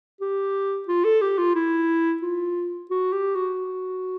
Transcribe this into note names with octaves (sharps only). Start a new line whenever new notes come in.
G4
F4
A4
G4
F4
E4
F4
F#4
G4
F#4